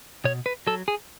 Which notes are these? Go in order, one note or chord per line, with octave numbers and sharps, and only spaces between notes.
B2 C#5
B4
F#3 A4
G#4